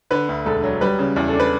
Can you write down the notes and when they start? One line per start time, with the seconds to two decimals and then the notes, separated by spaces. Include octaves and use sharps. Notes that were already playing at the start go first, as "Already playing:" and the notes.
0.11 D3 B4
0.29 D2
0.46 E1 A4
0.63 F#3
0.81 G3 B4
0.99 C#3
1.16 E2
1.28 A4
1.34 D4
1.40 B4